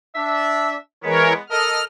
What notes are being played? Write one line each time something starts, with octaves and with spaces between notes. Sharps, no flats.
D4 E5
E3 G#3 B3 A#4 C#5
A4 A#4 D#5 F6